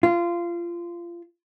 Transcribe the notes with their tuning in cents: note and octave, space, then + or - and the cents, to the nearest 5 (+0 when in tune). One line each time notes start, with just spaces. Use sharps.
F4 -20